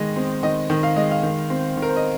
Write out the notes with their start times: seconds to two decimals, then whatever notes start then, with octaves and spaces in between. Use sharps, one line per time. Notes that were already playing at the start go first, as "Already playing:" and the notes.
Already playing: D#3 G#3 D#5
0.16 C4
0.43 D#3 D#5
0.70 D#3
0.83 F5
0.96 G#3 D#5
1.11 F5
1.23 D#3
1.50 C4
1.77 D#3
1.82 A#4
1.89 C5
1.96 D#5